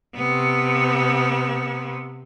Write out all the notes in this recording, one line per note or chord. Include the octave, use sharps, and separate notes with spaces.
C3 B3